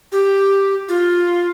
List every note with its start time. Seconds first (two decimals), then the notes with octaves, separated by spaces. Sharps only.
0.12 G4
0.89 F4